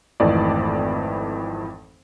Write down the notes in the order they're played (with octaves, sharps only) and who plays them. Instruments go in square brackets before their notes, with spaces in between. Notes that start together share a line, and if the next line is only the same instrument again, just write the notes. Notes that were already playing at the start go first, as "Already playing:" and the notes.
[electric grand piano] G#1 F2 E3 A3 D5 D#5